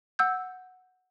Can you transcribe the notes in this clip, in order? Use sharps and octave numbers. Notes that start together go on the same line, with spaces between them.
F#5 E6 G6